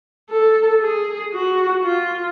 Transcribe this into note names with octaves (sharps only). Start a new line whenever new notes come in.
A4
G#4
F#4
F4